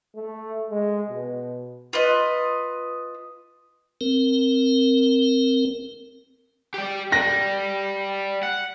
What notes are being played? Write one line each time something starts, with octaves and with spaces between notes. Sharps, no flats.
A3
G#3
B2
F4 B4 D#5
C4 A#4
G4 D5
G3 A#6
F#5